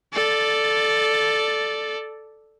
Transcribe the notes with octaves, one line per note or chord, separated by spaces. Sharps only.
A4 D5